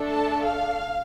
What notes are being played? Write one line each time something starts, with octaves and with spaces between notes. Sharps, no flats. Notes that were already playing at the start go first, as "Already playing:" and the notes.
Already playing: A3 D4 A4
A5
F5